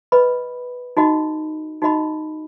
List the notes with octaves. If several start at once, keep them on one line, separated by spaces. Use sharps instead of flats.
B4 D#5 B5
D#4 F#4 D#5 B5
D#4 F#4 D#5 B5